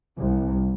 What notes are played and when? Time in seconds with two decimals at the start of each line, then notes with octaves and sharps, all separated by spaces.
0.17 C2